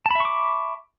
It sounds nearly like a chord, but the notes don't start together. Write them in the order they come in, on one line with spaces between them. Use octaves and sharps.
A5 B5 E5 C#6 D6